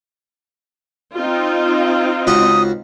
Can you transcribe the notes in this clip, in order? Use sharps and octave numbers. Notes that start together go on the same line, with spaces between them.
C4 D#4 F4
C#2 F#4 C#6 D#6